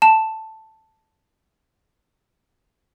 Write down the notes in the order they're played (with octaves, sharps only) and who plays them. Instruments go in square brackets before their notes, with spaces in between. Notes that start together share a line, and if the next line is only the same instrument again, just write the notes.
[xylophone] A5 E7